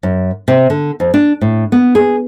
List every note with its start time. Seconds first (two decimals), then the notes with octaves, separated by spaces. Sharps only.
0.03 F#2
0.48 C3
0.70 D3
1.00 F2
1.14 D4
1.41 A2
1.72 B3
1.95 G#4